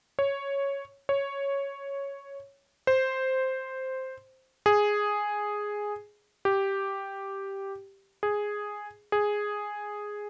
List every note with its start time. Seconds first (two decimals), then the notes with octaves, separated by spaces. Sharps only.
0.19 C#5
1.09 C#5
2.87 C5
4.66 G#4
6.45 G4
8.23 G#4
9.12 G#4